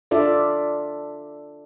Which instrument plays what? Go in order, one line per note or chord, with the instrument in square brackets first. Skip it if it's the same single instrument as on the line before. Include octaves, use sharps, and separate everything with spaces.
[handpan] D4 F4 A4 D5 E5